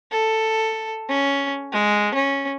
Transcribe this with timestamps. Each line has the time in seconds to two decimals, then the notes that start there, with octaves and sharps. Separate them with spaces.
0.12 A4
1.09 C#4
1.72 G#3
2.15 C#4